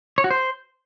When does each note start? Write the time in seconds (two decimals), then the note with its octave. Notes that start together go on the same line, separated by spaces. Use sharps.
0.18 C#5
0.24 F#4
0.31 C5